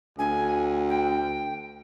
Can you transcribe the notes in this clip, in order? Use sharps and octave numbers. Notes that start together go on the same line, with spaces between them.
D2 G#5
G5